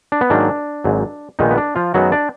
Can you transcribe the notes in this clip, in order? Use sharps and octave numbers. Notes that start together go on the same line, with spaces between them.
D4
B3
G#2 D#3 F#3 A#3 D4
G#1 G#2 F#3
A#1 A#2 D#3 G#3 B3 D#4
B3
D4
F3 F4
F#2 D#3 F#3 G#3 B3 F#4
D4 D5